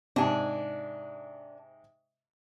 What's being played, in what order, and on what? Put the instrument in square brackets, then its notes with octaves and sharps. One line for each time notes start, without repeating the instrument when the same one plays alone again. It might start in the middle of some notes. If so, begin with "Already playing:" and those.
[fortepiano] G#2 C3 [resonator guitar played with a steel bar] D4 G#5